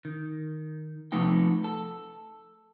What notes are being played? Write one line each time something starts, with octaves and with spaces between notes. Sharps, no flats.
D#3
C3 F3 A3 B3 D#4 G5
A4